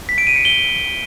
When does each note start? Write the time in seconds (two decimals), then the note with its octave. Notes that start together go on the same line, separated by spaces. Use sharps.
0.09 B6
0.18 D7
0.27 D#7
0.36 C#7
0.45 G7